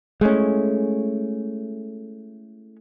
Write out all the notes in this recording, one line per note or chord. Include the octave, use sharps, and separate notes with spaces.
G#3 A3 C#4 E4